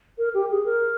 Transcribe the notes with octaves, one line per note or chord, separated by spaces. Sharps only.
A#4
G4
G#4
A#4